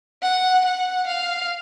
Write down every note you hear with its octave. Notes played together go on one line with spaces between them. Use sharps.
F#5
F#5
F5